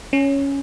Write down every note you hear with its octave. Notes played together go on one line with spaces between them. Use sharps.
C#4